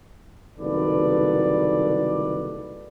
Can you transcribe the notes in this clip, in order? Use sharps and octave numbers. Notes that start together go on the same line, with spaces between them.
F#1 C2 D#3 A4 B4 D5